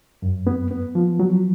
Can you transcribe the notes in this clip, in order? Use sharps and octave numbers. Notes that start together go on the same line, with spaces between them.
F#2
B3
B3
F3
F#3